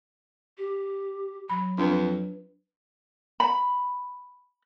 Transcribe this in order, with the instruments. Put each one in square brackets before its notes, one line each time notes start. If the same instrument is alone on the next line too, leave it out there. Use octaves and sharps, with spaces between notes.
[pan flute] G4
[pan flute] F#3 [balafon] B5
[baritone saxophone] F2 [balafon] D4 B4
[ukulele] B5